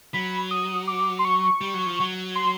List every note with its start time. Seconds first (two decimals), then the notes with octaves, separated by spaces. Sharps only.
0.14 F#3 B5
0.51 D#6
0.87 D6
1.19 C6
1.25 C#6
1.61 G3
1.74 F#3
1.86 F3
2.00 F#3
2.35 C6